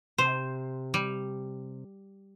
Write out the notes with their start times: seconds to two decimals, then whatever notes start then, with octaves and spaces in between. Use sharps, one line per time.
0.18 C3 C5
0.94 G3